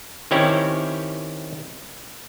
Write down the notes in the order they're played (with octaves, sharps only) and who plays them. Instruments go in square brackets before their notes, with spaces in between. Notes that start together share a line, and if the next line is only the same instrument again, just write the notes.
[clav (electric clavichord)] D#3 C4 C#4 E4 G4 C#5